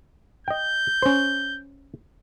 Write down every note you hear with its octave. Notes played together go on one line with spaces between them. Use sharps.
D#5 G5 G6
C#4 C5